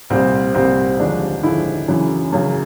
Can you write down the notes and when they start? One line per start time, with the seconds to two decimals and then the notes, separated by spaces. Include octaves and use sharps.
0.10 C2 A#2 G3 C4
0.55 C2 A#2 G3 C4
0.99 D#2 D3 F3 G#3 D4
1.43 D#2 D3 F3 G#3 E4
1.88 F#2 C#3 E3
2.32 F#2 C#3 E3